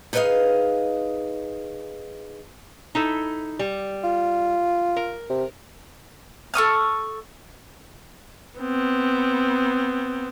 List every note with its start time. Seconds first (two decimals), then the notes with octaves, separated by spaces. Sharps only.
0.13 D#4 G#4 B4 D5 D#5 F5
2.95 D#4 E4 A4
3.59 G3
4.04 F4
4.96 A#4
5.30 C3
6.54 A4 C#6 D#6 F6
8.59 B3 C4